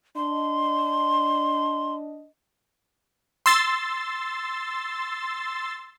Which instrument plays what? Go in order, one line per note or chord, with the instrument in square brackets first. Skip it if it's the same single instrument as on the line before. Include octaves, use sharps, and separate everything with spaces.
[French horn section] D4 D#5 [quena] C6
[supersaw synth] C6 E6 A6